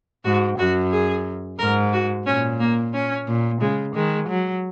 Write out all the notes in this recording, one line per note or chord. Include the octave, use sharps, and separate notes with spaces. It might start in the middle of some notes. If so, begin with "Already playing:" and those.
G#2 F#4
F#2 F#4
G#4
G#2 A#4
F#4
A#2 C#4
A#3
C#4
A#2
C#3 G#3
D#3 G#3
F#3